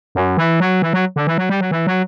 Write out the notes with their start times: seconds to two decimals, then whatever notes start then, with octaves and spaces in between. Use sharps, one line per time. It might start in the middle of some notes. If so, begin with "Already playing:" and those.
0.15 F#2
0.37 E3
0.60 F#3
0.82 E3
0.93 F#3
1.16 D3
1.27 E3
1.38 F#3
1.49 G3
1.61 F#3
1.71 E3
1.87 F#3